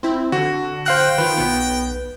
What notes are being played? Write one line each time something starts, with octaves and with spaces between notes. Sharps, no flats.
C4 E4
D3 F#4
C5 F5 G5 F#6
D#3 F4 B4
B1 B3